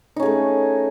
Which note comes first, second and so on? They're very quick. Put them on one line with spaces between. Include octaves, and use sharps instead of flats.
D#4 C#4 G#4 A3